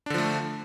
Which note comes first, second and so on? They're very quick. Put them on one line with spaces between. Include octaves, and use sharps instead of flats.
D4 D3 F3 A3